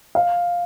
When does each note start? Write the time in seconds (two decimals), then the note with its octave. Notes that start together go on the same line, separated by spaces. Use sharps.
0.15 F5